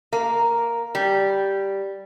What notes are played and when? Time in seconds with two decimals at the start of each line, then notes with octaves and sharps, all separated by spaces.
0.13 A#3
0.95 G3